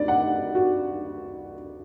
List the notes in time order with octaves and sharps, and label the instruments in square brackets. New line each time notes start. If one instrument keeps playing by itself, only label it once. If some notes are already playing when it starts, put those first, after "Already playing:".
Already playing: [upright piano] D2 D5
F#5
F#4